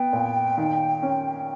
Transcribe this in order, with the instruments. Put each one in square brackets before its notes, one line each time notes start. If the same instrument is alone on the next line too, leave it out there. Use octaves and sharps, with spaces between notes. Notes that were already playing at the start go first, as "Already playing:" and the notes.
Already playing: [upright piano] B3 [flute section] G5
[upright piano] A#2
D#3
C#4